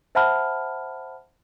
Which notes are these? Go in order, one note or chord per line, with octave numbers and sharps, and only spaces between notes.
C5 E5 F#5 A5 B5 F6